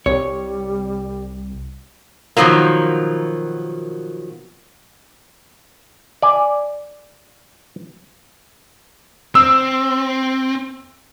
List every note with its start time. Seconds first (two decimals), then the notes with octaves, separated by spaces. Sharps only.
0.06 C2 G3 C#5
2.37 B2 D#3 F3 F#3 A#3
6.22 D5 G#5
9.35 C4 E6